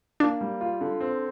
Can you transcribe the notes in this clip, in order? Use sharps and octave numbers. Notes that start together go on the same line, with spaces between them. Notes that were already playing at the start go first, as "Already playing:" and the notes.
A#3 D4
G3
F4
D3
C4